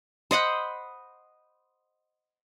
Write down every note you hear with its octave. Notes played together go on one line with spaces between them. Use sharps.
C5 D#5 F#5 B5